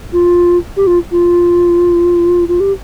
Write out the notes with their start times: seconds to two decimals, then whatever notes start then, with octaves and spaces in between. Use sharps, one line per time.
0.13 F4
0.77 G4
0.87 F4
1.12 F4
2.48 F4
2.60 G4